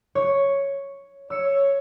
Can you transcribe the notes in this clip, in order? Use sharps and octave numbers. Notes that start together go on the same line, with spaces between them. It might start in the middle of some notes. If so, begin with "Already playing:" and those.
C#5
C#5 E6 C#7